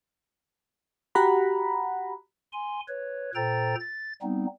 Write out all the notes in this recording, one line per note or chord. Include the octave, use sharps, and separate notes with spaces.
F#4 G4 F#5 A#5 B5
G#5 C6
B4 C#5
A#2 A4 C5 G5 A#5 A6
A6
G3 B3 C4 D#4